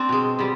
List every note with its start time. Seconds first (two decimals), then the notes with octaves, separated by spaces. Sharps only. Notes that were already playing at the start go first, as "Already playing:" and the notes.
Already playing: C4 D4
0.09 B2 G#3
0.39 B2 G3